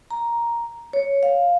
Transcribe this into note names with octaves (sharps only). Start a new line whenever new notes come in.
A#5
C#5
F5